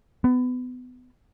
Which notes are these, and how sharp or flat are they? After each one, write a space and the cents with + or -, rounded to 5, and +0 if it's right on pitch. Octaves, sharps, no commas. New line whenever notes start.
B3 +25